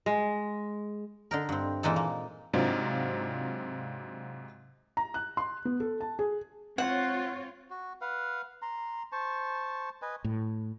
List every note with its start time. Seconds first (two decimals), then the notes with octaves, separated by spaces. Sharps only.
0.06 G#3
1.31 D3 D#4 A#4
1.49 G2 C4
1.83 A#2 E3 G#3 D#4 A4
1.96 A#3
2.53 G#2 C3 F#3 C4 D4 F4
4.97 A#5
5.14 F#6
5.37 C6
5.65 B3
5.80 A4
6.01 A5
6.19 G#4
6.78 C4 F4 C#5 F#5
7.70 F#4
8.01 B4 F5 F#5
8.62 A#5 C6
9.12 C5 A5 C#6
10.02 B4 D#5 G#5
10.24 A2